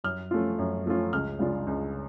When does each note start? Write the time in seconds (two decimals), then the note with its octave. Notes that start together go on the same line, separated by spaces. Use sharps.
0.04 F#2 F6
0.31 F3 A3 C#4 F4
0.59 F#2
0.86 F3 A3 C#4 F4
1.13 C#2 F6
1.39 C#3 G#3 D4 F4
1.67 C#2